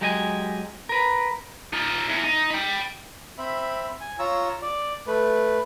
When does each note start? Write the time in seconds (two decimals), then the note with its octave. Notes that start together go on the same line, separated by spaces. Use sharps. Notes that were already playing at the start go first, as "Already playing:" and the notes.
0.01 F#3 G#3 G4 D#5 G5 G#5
0.89 A#4 B4
1.73 D#4 F4
2.09 E2
2.25 D#4
2.51 G5 B5
3.38 C4 E5 B5
4.01 G#5
4.19 F4 C#5 A#5 E6
4.62 D5
5.07 A3 B4